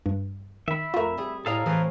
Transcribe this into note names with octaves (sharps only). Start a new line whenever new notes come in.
G2
D#3 E5 B5
F2 A3 F4 A#4
G3 G#4
A2 G#4 A4 D5 D#5 F5 A#5
A2 E3 C4 G#4